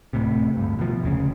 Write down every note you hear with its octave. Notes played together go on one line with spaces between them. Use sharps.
D1 A2 C3
D2 G2
B2 F3
F1 D2 C#3